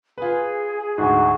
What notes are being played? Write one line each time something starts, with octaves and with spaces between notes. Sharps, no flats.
F4 G#4 B4
D2 G#2 F#4